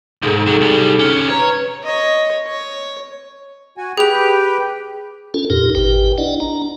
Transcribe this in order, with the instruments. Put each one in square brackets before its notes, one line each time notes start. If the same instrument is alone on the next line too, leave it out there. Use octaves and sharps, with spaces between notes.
[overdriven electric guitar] C#2 G#2 [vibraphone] D#4 G#4 A4
[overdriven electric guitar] C3 F#3
C2 G3
D3 C#4
[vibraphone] B4 A#5 [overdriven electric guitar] C#5
[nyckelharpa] C#5 D#5
C#5
[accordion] F#4 G#5
[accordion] G4 B4 G5 [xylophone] G#4 F7
[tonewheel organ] C#4 F4 A4
F2 A#2 D#4 G4 A#4
G#1 G4 B4 G5
D4 E4 D5 D#5 F#5
D4 A#5